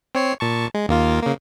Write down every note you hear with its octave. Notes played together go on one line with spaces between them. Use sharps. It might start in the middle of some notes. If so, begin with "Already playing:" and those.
C4 C#5 C7
A#2 A5 C#6
G#3
D#2 A#3 F4
C#3 A#3